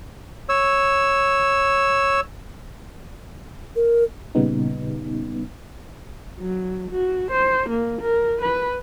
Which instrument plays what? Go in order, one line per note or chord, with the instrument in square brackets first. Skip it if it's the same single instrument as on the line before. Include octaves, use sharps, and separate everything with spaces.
[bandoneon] C#5 E6
[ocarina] A#4
[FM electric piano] A#2 C#3 G3 B3 D#4
[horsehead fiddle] F#3
F#4
C5
A#3
A#4
B4